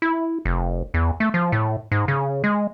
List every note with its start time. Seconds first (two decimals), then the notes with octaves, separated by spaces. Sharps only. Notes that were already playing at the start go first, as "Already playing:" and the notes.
0.02 E4
0.45 F1
0.94 E2
1.20 A3
1.34 F3
1.52 A2
1.92 G#2
2.08 C#3
2.44 G#3